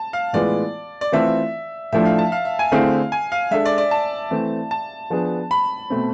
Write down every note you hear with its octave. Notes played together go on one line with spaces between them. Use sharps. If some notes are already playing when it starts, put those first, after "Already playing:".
Already playing: A5
F5
A2 E3 G#3 B3 F4 D5
D5
E3 A3 C4 F4 A4 E5
A2 F3 A3 D4 E5
F5
A5
F5
E5
G#5
D3 A3 C4 E4 G#4 F5
G#5
F5
G#3 D4 A4 E5
D5
D5
A5
E3 A3 C4
A5
F3 B3 D4 G#4
B5
B2 A3 C4